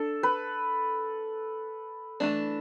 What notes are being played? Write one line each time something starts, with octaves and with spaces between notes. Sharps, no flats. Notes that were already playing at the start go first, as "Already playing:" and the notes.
Already playing: D4 A4
B4
E3 A3 D4